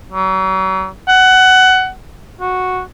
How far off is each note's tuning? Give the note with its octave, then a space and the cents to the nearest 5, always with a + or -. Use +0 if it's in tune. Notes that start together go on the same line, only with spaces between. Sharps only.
F#3 +40
F#5 +15
F#4 -5